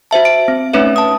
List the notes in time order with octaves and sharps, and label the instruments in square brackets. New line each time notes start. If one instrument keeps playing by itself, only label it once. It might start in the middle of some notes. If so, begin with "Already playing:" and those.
[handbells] F#4 C5 E5 A5
D7
C4
A3 C#4 D#4 B4 C#5 E5
A5 D#6